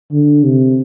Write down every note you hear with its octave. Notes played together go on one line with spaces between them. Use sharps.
D3
C3